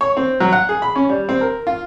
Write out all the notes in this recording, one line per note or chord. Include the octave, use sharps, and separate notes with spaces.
C#5
C4
F#3
F#5
G#4
B5
C#4
G3
C4
A#4
F4